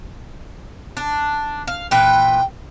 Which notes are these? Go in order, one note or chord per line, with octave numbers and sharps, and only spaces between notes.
D4
F5
A#2 E3 B4 G5